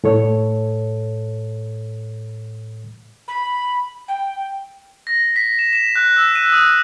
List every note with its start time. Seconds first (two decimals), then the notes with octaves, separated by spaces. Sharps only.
0.04 A2 A4 C#5
3.28 B5
4.08 G5
5.07 A#6
5.36 B6
5.59 E7
5.73 E7
5.96 F#6
6.16 E6
6.35 D#7
6.52 D#6